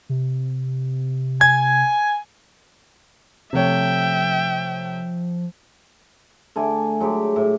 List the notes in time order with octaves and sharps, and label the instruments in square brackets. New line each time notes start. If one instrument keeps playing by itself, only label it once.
[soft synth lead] C3
[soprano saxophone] G#5 [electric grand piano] G#6
[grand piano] C3 A3 C#5 [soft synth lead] F3 [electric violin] E5 G5
[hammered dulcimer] D3 A3 G#5
F#3 G#3 G4
A2